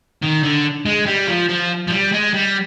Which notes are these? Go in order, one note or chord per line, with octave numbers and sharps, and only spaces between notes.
D#3
D3
G#3
G3
F3
F3
F3
G3
G#3
G3